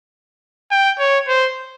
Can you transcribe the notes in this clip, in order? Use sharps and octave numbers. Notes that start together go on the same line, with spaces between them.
G5
C#5
C5